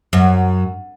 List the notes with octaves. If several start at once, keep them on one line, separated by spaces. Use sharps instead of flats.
F#2